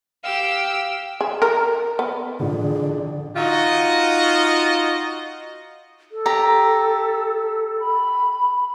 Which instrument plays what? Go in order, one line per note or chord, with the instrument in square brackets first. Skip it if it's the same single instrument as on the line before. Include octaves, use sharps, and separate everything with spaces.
[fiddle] G4 E6 [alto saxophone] F5
[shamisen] G#4
A#4
B3
[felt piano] A1 F3 [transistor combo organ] D3 [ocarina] G#4
[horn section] D#4 F4 F#4 D#5
[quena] A4
[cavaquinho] G4 A#5
[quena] B5